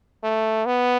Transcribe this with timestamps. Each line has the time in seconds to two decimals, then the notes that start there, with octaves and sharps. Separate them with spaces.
0.23 A3
0.66 B3